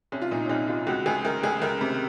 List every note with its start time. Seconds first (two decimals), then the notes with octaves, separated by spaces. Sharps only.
0.12 C2 C#4
0.22 F4
0.31 A#2 D#4
0.45 C#4
0.49 C2 D#4
0.68 C2 F4
0.87 C#2 F#4
1.06 C#2 G#4
1.25 C#2 A#4
1.43 C#2 G#4
1.62 C#2 A#4
1.81 C3